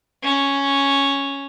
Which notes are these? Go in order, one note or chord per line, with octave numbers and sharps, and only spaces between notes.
C#4